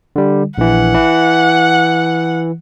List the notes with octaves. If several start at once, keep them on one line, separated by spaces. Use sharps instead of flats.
D3 G3
A#1 E3 F#5
E3